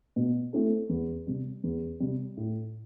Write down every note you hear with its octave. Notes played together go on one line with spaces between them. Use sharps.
B2
A3 C4 E4 A4
E2
C3 G3
E2
C3 G3
A2